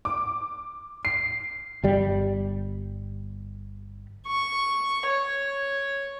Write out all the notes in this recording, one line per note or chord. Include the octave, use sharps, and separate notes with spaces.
D6
C7
G1 G3
C#6
C#5